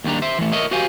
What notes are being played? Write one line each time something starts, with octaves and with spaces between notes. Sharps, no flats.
D#2 D#3 G3 D4 A#5
C5 E5
E3 A3
A#4 C#5 D#5 E5
F#4 G4 C5 F5 G#5